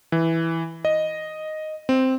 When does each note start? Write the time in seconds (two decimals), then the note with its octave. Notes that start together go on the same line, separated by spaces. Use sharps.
0.12 E3
0.85 D#5
1.89 C4